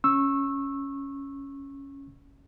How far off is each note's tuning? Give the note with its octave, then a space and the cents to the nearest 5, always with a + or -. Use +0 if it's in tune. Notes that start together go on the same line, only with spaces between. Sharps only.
C#4 +0 C#6 -20 E6 +0